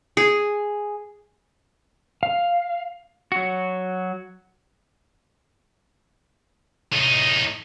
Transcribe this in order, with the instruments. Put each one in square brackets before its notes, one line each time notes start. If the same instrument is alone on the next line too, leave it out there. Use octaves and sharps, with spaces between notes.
[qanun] G#4
[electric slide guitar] F5
F#3 F#4
[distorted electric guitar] A2 D#4